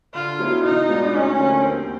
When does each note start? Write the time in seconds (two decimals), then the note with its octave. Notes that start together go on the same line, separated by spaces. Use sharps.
0.14 D3 F4
0.39 F#3 B3 E4
0.64 B2 D#4
0.88 G#3 B3 D4 F4
1.13 D2 C#4
1.38 D3 F3 A#3
1.62 D#2 C4